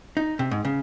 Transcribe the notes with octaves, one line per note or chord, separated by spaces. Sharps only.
D#4
C3
G#2
C#3